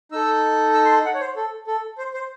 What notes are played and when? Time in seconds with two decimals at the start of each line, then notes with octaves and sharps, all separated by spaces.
0.12 D#4 A4 E6
0.74 E6
0.85 C6
0.90 A5
1.05 F#5
1.14 C#5
1.21 C5
1.36 A4
1.67 A4
1.98 C5
2.14 C5